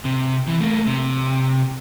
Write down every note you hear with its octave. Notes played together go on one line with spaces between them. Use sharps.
C3
E3
A3 A#3
C3